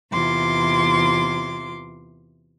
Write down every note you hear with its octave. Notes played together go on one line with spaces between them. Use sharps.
E2 C3 F4 C6 D6